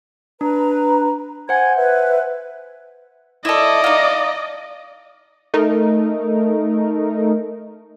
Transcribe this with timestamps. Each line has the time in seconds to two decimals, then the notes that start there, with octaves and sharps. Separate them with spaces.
0.41 D4 B4 A#5
1.49 C5 F#5 G#5 G#6
1.76 B4 E5
3.45 E4 A4 D5 D#5
3.84 D#4 F4
5.54 A3 D#4 A#4